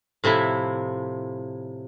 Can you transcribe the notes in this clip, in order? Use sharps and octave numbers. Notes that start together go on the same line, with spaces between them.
A2 C3 F3 E4